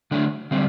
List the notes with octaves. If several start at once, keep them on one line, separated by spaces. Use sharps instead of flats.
D3 F#3 A3 D4
D3 G3 C4